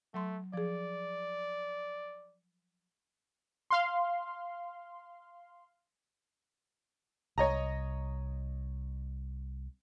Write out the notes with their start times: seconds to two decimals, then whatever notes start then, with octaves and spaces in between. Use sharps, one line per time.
0.14 F#3 A3 C6
0.54 F3 G#4 D5
3.70 F5 C6
7.38 C2 C#5 D#5 A#5